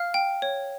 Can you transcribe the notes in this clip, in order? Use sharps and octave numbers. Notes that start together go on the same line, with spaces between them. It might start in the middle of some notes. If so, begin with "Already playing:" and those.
Already playing: F5 F6
G5
C#5